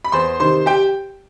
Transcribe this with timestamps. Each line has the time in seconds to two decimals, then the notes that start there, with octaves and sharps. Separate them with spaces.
0.04 B5
0.12 E2 C5 C6
0.40 C3 D#3 C5 C6
0.66 G4 G5